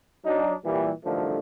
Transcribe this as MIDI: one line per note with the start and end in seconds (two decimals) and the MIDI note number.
0.25 0.53 54
0.25 0.53 62
0.25 0.53 63
0.65 0.89 46
0.65 0.89 52
0.65 0.89 55
1.04 1.39 33
1.04 1.39 43
1.04 1.39 50
1.04 1.39 51
1.04 1.39 53
1.04 1.39 57